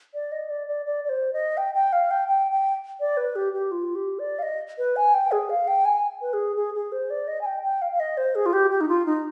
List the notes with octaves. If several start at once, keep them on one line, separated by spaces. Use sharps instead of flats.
D5
D#5
D5
D5
D5
D5
C5
D#5
G5
G5
F5
G5
G5
G5
D5
B4
G4
G4
F4
G4
D5
F5
D#5
B4
G#5
G5
G#4
F5
G5
G#5
B4
G#4
G#4
G#4
C5
D5
D#5
G#5
G5
G5
F5
F5
D#5
C5
G#4
F4
G4
G4
D#4
F4
D#4